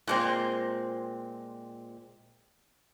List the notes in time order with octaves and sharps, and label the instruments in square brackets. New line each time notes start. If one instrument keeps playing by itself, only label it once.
[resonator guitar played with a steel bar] A#2 G#3 C4